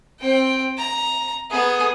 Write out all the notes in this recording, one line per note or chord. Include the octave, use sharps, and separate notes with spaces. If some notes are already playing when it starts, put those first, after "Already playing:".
C4 G5
A#5
B3 G#4